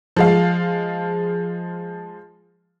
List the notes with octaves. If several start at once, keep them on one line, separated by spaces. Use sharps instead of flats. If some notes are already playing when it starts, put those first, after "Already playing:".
F3 G#3 F5